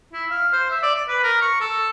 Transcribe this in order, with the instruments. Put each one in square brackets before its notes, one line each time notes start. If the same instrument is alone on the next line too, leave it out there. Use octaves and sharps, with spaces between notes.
[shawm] E4
F5
C5
E5
D5
D5
B4
A#4
C#6
A4